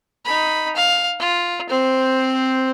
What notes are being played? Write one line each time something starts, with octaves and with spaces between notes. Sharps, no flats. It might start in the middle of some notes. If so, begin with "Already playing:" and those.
D#4 B5
F5
F4
C4 C5